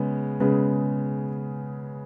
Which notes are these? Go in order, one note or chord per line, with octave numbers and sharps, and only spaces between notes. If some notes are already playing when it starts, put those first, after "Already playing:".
Already playing: C#3 G#3 B3
C#3 G#3 B3